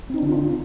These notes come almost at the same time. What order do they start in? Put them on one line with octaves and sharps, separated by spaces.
C4 D#4 D4 D3 F4